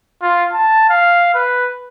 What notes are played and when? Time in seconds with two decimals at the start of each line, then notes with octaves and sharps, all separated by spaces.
0.22 F4
0.53 A5
0.90 F5
1.34 B4